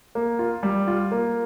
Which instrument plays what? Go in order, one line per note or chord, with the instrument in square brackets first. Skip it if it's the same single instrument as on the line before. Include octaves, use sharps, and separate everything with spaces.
[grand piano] A#3
F4
G3
F4
A#3